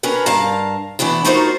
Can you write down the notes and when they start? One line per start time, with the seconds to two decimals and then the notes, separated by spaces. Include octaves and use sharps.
0.03 C#4 D4 A#4 B4
0.26 G2 A#4 F5 A5
0.99 E3 A3 B3 D4 E4
1.25 A3 D#4 F4 F#4 A#4 C5